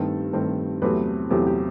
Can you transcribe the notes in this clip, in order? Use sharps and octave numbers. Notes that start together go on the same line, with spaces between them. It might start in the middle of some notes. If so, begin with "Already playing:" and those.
Already playing: G2 D#3 A3 C4 A4
G2 D#3 A3 C4
E2 C3 F#3 A3 C4 B4
E2 C3 F#3 A3 C4 G4
G4